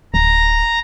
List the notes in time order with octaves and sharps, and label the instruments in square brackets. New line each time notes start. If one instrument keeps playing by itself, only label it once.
[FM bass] D1 [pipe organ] A#5